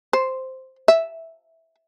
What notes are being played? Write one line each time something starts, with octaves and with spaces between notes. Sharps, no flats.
C5
E5